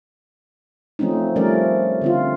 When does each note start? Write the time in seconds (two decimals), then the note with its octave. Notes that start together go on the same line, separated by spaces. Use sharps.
0.99 F3 A3 C4 C#4 D#4
1.36 F3 G3 A3 C#4 A#4 D5
2.02 D3 C4 F4